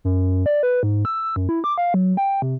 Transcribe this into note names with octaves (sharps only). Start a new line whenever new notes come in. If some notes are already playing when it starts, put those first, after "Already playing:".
F#2
D5
B4
G#2
E6
F#2
E4
D6
F5
F#3
G5
C3